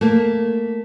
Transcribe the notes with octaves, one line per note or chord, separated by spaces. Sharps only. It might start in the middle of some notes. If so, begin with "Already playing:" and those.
A3 A#3